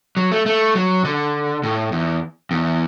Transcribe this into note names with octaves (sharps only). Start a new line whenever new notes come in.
F#3
A3
A3
F#3
D3
A2
E2
E2